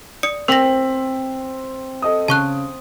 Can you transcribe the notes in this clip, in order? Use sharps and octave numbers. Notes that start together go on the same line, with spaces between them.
D5 D#6 C#7
C4 A#4 E6 A#6 B6 F#7
A4 D#5 D#6
C#3 A5 C#6 F#6